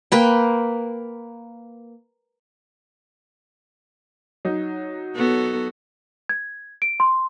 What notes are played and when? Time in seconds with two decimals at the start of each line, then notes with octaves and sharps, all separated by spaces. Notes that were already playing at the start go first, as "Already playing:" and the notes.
0.12 A#3 B4 G5
4.45 F#3 D#4
5.16 B3 F#4 A4
6.29 G#6
6.82 D7
7.00 C6